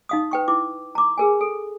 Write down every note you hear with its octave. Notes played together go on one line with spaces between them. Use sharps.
D#4 F5 D#6
B4 G5 C#6
E4 D6
A#5 D6
G#4 A#4 G#5
A4